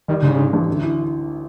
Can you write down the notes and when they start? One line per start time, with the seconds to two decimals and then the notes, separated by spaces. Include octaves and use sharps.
0.08 D#3 G3
0.23 G#2 C#3
0.38 G#2
0.53 A1
0.68 D2
0.83 E3